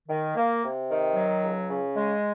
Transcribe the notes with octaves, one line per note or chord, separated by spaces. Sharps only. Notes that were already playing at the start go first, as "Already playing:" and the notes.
D#3
A#3
C3
D#3
F#3
C#2
C#3
G#3